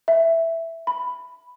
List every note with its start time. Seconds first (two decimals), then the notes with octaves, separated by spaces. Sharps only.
0.08 E5
0.87 B5